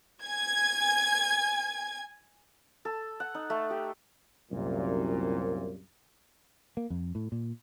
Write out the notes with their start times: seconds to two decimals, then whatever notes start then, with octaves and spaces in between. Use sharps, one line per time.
0.23 G#5 G#6
2.85 A4
3.20 F#5
3.35 D#4
3.50 A3
3.70 G4
4.51 C2 F#2 A#2
6.77 A#3
6.90 F2
7.15 A2
7.32 A#2